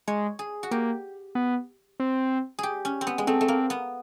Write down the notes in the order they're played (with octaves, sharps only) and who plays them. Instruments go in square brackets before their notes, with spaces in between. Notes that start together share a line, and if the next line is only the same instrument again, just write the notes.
[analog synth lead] G#3 [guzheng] C#5
[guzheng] G#4
F#4
[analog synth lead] A#3 [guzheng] G4
[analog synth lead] B3
C4
[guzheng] G4 G#4
C#4
C4
B3
G#3
[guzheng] A3 [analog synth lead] C4
[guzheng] A3
A#3
B3